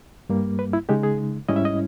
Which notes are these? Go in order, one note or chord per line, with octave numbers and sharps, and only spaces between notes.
G2 G3 A#3
B4
E4
C#3 G#3 D#4 G4
G#4
G#2 G3 C#4 E4 D#5
E5
D#5